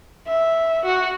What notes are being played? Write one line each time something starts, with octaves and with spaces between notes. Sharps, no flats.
E5
F#4 F#5